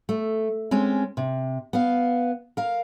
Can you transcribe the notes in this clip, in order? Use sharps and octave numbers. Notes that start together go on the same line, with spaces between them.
A3
G#3 C4 C#4
C3
B3 F5
A#4 F5